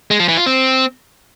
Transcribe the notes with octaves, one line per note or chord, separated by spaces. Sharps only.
G#3
F3
E3
F4
C4